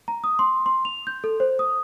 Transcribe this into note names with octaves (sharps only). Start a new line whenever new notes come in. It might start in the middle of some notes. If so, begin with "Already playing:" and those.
A#5
D#6
C6
C6
F7
G6
A4
C5
D#6